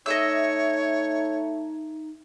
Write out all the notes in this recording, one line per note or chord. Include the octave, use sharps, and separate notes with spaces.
A3 D#4 C#5 D#5 E5 E6